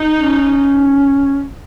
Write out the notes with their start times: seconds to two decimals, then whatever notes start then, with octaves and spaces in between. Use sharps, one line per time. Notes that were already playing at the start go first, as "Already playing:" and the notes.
Already playing: D#4
0.17 C#4